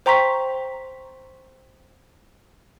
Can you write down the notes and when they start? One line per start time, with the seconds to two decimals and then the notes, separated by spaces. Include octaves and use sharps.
0.06 C5 G5 A#5 C6 C#6 B6